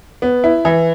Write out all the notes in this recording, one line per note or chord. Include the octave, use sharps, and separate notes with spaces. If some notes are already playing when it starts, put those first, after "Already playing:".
B3
E4
E3